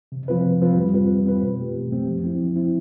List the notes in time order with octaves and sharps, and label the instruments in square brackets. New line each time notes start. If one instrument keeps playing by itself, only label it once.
[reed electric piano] C3
F3 C4 F4 B4
C3
F3 C4 F4 B4
G3
C4 F4 B4
G3
C4 F4 B4
B2
A3 C4 G4
B2
A3 C4 G4
F3
C4 E4
F3
C4 E4